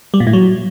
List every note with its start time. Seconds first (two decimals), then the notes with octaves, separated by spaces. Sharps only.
0.14 G3
0.20 A#2
0.27 A2
0.33 F#3